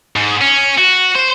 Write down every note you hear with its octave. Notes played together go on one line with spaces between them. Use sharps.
G#2
C#4
F#4
C5